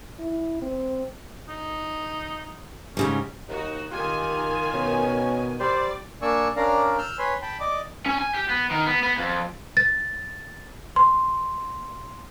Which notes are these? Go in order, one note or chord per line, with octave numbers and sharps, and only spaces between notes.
E4
C4
D#4
G#2 C#3 G3 C#4
D#2 D#4 F#4
D#3 F4 G4 G#5
B2 C#4
G3 C5 D5
A#3 D4 D5 G#5 C#6 E6
C#4 D4 A#4 D5 F5 A#5
E6 F6 G6
B4 C#5 G#5 B5 C6
G5 A5 B5
D5 D#5 D6
C#4
G#5
G4
B3
D#3
B3
B3
F2
A6
C6